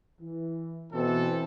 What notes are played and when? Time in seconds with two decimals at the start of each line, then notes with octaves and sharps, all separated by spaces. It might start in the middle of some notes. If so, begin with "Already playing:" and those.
0.20 E3
0.93 B2 E3 C4 A4